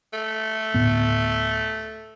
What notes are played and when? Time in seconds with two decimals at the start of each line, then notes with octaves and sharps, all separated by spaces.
0.13 A3
0.74 D2 A2 B3